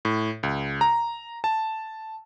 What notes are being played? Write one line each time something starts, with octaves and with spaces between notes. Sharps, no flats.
A2
C#2
A#5
A5